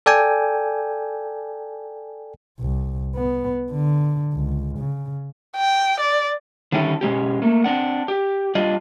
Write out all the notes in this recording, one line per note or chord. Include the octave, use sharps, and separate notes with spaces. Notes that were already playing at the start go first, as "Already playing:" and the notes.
A4 D5 G5 G#5
C2
B3
D3
C#2
C#3
G5
D5
D3 D#3 G3 C#4 E4 A4
B2 G#3 C#4 G4
A3 A#3
C4 D4 F#5
G4
G3 D4 F4 D5 D#5